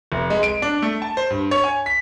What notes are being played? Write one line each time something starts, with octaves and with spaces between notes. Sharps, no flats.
F1
G#3
D7
D4
A3
A5
C5
G2
C#5
G#5
B6